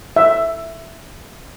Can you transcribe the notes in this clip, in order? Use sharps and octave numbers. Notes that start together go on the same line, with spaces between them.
E5